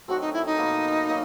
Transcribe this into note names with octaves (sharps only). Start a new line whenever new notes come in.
D#3 F#3 A3 C4 F#4
D#4
E4
D#4
B2 F#3 A#3
F#3 A#3